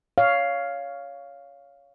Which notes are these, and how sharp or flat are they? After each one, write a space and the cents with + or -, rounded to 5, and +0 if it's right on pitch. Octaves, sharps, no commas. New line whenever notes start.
C#5 +15 F5 +0